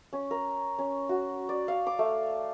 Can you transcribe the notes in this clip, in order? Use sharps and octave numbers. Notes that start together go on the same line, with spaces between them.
C#4
A#4
C#4
F#4
D5
F5
D6
A3